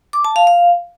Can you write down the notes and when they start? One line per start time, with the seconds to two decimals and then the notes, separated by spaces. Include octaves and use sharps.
0.13 D6
0.25 A5
0.36 F5
0.47 F5